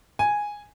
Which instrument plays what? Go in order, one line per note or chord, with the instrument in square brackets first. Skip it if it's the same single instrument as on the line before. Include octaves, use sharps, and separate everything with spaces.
[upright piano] G#5